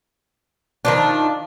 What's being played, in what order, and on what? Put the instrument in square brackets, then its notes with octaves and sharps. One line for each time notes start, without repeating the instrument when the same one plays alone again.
[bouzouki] D#3 F3 D4